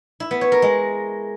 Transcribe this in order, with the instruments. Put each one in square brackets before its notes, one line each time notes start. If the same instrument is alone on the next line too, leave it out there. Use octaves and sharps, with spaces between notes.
[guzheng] E4
B3
C#5
A#4
G#3